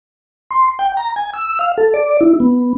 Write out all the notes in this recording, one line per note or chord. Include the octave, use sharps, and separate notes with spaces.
C6
G5
A#5
G#5
E6
F5
A4
D5
E4
B3